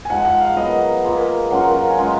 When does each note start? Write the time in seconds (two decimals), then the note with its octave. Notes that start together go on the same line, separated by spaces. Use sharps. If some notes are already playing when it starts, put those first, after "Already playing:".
0.05 G#5
0.10 F3 G#3 D#4 F#5
0.25 F#5
0.41 F5
0.57 F#3 B3 F#4 A#4 D#5
1.04 A#3 F4 G#4
1.51 F#3 C#4 F4 A#4 F#5
1.71 F#5
1.75 F5
1.90 G#5
1.99 G#3 C#4 F4 F#5